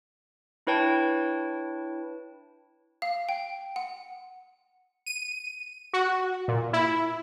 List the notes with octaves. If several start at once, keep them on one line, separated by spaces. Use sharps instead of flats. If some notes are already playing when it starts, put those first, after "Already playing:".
D4 E4 B4 C#5 G5 A5
F5
G5
F#5
D#7
F#4
A#2
E4